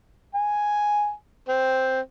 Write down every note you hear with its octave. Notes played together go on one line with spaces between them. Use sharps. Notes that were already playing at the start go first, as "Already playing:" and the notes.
G#5
C4